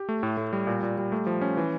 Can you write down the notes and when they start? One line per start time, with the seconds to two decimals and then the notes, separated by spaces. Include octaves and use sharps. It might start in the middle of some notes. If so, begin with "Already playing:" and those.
Already playing: G4
0.09 A3
0.23 A2
0.37 A2
0.53 G3
0.67 A#2
0.83 A#2
0.98 G3
1.12 A3
1.27 F3
1.41 C#4
1.57 E3